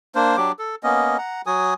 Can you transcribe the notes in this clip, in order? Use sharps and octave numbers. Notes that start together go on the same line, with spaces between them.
A#3 D4 C5
F#3 D4 G4 D6
A4
A#3 B3 C#4 D#5
F#5 A#5
F#3 F#4 G#5 D#6